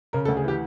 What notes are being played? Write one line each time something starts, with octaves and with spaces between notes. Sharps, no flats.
C#3 A#4
A4
D2
G#4
E3 G4